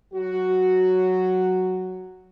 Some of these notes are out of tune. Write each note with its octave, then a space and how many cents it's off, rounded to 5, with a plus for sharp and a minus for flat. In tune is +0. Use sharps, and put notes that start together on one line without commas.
F#3 +0 F#4 +0